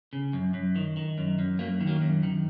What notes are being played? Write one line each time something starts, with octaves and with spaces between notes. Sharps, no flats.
C#3
F#2
F#2
D#3
D#3
F#2
F#2
F#2 F#3 A#3
D#3
F#3 A#3
F#2
D#3